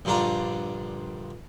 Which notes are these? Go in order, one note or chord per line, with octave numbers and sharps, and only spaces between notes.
A#1 G2 D3 D4 F4 A#5